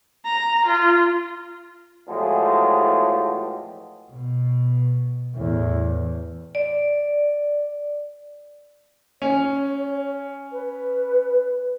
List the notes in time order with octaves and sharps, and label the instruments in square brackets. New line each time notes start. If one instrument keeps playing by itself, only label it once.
[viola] A#5
F4
[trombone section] E2 A2 F3 G#3 F#4 G4
[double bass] B2
E2 A2
[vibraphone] D5
[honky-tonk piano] C#4 [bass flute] C#5
[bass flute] B4